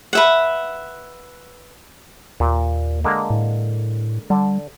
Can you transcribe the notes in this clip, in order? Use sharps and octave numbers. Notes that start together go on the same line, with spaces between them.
B4 E5 F#5
D#2 A#2
D3 G#3 A#3
A2
D3 G3